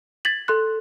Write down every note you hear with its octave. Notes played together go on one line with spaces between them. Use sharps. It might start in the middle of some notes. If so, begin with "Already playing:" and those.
G#6 A6 B6 F#7
A4 C6 F#6